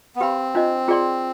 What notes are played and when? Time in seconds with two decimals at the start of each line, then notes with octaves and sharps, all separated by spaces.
0.16 B3
0.20 C4 G4 B4 F5 B5
0.55 D4 F4 C5 D#5
0.88 F4 G#4 D5 G5 C6